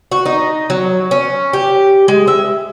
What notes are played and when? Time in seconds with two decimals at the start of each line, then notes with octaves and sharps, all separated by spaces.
0.12 F#4
0.26 D#4
0.70 F#3
1.11 C#4
1.53 G4
2.08 G#3
2.28 E5